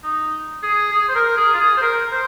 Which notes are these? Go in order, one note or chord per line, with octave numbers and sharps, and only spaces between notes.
D#4
G#4
G#4
C5
A#4
G#4
F4
G#4
C5
A#4
A#4
C5